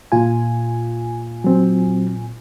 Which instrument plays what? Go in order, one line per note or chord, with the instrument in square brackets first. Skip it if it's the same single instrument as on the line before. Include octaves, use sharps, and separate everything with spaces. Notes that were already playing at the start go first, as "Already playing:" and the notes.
[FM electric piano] A#2 F4 G#5
[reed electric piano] F#3 C4